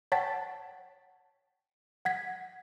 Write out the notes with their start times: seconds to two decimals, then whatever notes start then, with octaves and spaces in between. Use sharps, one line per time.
0.12 C#5 F#5 G5 A5 A6 B6
2.05 F#5 G#6 B6